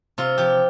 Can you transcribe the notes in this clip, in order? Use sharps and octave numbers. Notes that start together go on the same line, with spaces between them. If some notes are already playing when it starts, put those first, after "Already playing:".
C3 F4
F3 G4